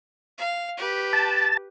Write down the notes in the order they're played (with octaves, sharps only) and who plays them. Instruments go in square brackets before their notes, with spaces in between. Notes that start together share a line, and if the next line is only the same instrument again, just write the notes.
[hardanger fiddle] F5
G4 B4
[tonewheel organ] A5